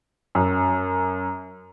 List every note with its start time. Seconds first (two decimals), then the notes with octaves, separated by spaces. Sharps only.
0.35 F#2